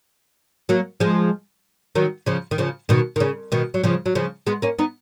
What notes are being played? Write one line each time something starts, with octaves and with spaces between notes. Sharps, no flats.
F#3 A#3
F3 G#3
D#3 F#3
C#3 F3
D#3
C#3 F3
B2 D#3
D#3
C#3
B2 D#3
F#3
C#3 F3
F#3
C#3 F3
G#3 B3
A#3 C#4
B3 D#4